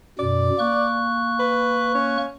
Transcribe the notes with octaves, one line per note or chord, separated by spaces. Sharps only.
F#2 B2 D5
A#3 C#6 F#6
B4
C#4